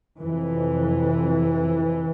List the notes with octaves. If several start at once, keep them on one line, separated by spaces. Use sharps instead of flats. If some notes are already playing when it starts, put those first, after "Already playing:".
F2 C3 E3